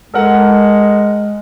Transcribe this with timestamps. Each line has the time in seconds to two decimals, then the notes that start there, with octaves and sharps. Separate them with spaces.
0.14 G#3 A4 A#4 F#5